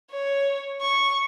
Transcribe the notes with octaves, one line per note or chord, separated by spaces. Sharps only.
C#5
C#6